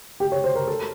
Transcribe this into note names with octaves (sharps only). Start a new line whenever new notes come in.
G4
C#5
C5
A#4
A4